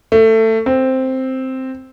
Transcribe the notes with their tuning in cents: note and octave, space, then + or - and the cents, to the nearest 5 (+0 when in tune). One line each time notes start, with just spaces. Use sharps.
A3 +20
C4 +0